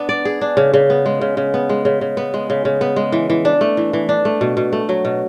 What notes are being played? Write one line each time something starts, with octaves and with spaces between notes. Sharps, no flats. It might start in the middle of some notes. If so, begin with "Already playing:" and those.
Already playing: B3 D4
D5
G#4
D4
C#3
C#3
B3
G#3
C#3
C#3
B3
G#3
C#3
C#3
B3
G#3
C#3
C#3
B3
G#3
E3
E3
D4
A3
E3
E3
D4
A3
B2
B2
A3
F#3
B2